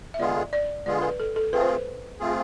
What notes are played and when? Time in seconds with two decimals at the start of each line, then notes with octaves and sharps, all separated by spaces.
0.14 E5
0.19 D3 G#3 B3 F4 G#4 D5
0.53 D5
0.86 D3 G#3 B3 F4 G#4 D5
1.02 B4
1.20 A4
1.36 A4
1.53 A3 C4 F4 G#4 B4
1.61 C5
1.68 B4
2.19 A3 C4 F4 G#4